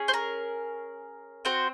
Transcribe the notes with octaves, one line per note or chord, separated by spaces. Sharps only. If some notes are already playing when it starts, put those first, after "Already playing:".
Already playing: C#4 G#4
C5
A#4
C4 F#4 C5